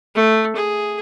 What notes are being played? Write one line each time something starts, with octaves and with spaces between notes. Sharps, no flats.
A3
G#4